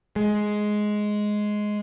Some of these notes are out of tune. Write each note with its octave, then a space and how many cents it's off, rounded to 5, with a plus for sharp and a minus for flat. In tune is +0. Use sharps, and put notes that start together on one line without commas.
G#3 +10